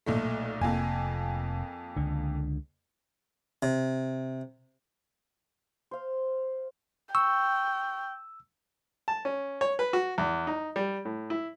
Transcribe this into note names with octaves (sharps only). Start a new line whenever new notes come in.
B1 A#2 A3
F1 F2 A#3 G#5
C#2 D3
C3
C5 F5
G5 C#6 E6
A5
C#4
C#5
B4
F#4
E2
D#4
G3
A2
E4